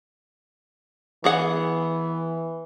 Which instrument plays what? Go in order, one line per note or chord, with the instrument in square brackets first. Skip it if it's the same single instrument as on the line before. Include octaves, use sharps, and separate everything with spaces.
[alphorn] E3 [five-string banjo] B3 G#4 F#5